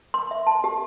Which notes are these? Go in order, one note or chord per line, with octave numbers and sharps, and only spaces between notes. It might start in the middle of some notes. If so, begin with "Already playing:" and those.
C6
E5
A5
G4